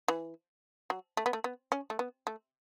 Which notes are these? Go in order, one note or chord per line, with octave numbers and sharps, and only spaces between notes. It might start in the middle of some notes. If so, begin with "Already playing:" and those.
E3
F#3
A3
B3
A3
B3
C#4
A3
B3
A3